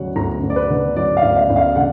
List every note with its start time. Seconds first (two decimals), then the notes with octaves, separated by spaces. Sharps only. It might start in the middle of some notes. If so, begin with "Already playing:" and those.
Already playing: D2 D3 F#3 F#5
0.16 D2 A#5
0.43 D2
0.50 D5
0.56 B4
0.70 D3
0.96 F#3 D5
1.17 F5
1.23 D2
1.37 F5
1.50 D2
1.56 F5
1.76 D3 F#5